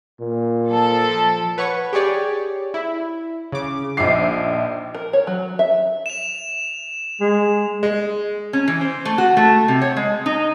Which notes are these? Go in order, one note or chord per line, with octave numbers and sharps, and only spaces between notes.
A#2
F3 A4
B4 C#5 F#5 C#6
G4 G#4 C#5 D5
E4
C#3 D6
A#1 F3 D#4 E5 D6 C7
A#4
C#5
F#3
E5
E7 F7
G#3
G#3
C#4
E3
C5
A3
F#4
A3
C3
C#5
G#3
D#4